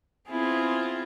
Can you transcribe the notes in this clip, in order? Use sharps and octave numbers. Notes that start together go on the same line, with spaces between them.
B3 C4 E4 F4 G#4